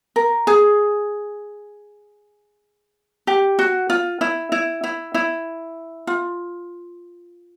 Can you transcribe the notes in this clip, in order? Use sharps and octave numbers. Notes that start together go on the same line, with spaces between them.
A#4
G#4
G4
F#4
F4
E4
E4
E4
E4
F4